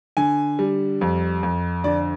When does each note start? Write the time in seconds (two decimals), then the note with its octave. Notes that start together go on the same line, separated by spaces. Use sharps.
0.17 D3 G#5
0.59 G3
1.01 F2
1.43 F2
1.84 D3 D5